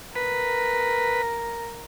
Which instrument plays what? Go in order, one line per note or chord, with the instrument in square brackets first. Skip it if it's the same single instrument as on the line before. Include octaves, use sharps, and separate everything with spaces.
[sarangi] A#4 [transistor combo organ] B4